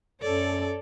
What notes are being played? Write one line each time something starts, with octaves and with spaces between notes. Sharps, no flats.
F#2 A4 C#5 D5